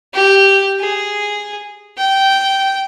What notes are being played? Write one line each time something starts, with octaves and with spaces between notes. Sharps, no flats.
G4
G#4
G5